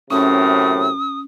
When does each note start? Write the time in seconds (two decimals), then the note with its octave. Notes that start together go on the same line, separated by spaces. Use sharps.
0.10 F#2 A2 C3 C#4 D#6